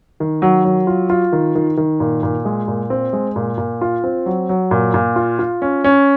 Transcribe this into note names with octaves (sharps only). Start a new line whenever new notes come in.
D#3
F#3
F#3
F4
F4
D#3
D#3
D#3
A#2
A#2
G#3
A#2
C4
G#3
A#2
A#2
F4
C4
F#3
F#3
A#2
A#2
F4
F4
C#4
C#4